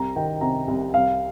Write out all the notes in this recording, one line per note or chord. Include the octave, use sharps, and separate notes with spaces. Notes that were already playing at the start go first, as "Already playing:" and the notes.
Already playing: C2 A#5
D#3 G5
C3 A#5
C2
C2 F5